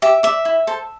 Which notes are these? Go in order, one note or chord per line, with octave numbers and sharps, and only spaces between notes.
G4 E5
D5 E5
E4
A4 C5